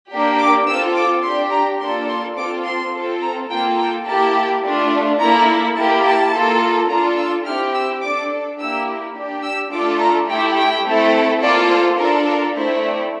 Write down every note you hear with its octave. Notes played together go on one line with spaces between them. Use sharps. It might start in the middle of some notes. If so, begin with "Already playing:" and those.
A#3 D4 G4
D6
C4 F4 A4 E6
D6
D4 G4 C6
A#5
A#3 D4 F4 A4 C6
C6
C4 F4 A4 D6
C6
C4 F4 A4
A#5
A#3 F4 A4 G5
G5
A#3 E4 G4 A5
A3 D4 F4
A#3 E4 A4 A#5
A#3 E4 G4 A5
A5
A#3 F4 A4
D4 F4 A4 A#5
E6
C4 E4 G4 F6
E6
D4 A4 D6
A#3 E4 G4 E6
D4 G4
E6
A3 D4 F4 A4 D6
A#5
A3 E4 G4 G5
G5
A3 C4 E4 A4
A#3 F4 A4 D5
C5
D4 F4 A4 A#4
A#4
A3 C4 E4 C5
D5